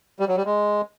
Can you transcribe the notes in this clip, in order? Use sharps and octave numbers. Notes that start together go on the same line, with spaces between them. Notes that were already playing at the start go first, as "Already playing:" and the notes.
G3
F#3
G3
G#3